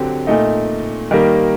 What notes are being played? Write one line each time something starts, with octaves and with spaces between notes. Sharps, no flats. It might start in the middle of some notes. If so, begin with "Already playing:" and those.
Already playing: D3 F#3 C4 G4
A#2 A3 D#4
D#3 G3 A#3